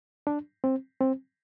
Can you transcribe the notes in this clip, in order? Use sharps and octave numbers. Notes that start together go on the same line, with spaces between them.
D4
C4
C4